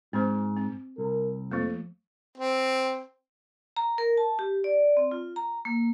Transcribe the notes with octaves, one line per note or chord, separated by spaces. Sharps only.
G#2 C4 C5
C4
C2 A#4
F2 F3 A3 A#3
C4
A#5
A#4
A5
G4
D5
C4
F4
A#5
A#3